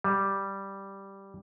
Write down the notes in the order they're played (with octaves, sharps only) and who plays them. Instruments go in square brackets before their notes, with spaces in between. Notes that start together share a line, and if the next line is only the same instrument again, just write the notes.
[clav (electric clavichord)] G3